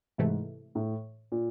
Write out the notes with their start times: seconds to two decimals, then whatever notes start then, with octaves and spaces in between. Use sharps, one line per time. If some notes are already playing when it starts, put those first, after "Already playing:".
0.18 G#2 C3 E3 A3
0.75 A2
1.32 A#2